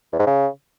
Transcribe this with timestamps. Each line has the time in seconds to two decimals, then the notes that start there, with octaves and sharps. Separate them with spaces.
0.12 E2
0.19 G#2
0.27 C#3